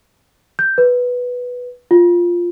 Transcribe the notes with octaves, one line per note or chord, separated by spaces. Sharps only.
G6
B4
F4